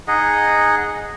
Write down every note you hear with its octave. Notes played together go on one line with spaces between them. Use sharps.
D#4 G#4 D#5 F#5